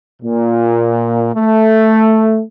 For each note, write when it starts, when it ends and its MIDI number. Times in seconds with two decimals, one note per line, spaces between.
0.22 1.28 46
1.35 2.41 57